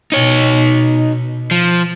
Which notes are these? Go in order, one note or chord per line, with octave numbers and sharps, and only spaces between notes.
B2 D#4 C#5
F3